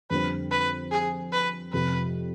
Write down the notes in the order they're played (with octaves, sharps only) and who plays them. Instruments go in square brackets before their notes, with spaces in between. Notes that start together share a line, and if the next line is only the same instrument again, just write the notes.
[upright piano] F2 D3 G3 C4 [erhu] B4
[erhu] B4
G#4
B4
[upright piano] F2 C3 F3 [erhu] B4